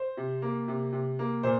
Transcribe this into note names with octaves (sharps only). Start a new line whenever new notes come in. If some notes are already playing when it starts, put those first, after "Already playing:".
Already playing: C5
C3
A#3
C3
C3
A#3
A#2 C5